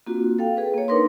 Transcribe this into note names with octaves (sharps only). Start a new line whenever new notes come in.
A#3 C4 D4 F4 F#4
A4 F5 G5
G#4 B4
A#3 C#5
D4 D#4 A#4 B4 C6